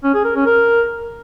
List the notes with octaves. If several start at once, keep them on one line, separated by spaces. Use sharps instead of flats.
C#4
G#4
A#4
C#4
A#4